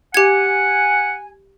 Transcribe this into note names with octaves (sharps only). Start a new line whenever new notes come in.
G4 F#5 G#5 G#6